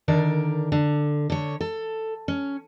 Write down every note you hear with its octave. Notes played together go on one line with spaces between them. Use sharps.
D3 D#3 A#4 D5
D3
D3 C#5
A4
C#4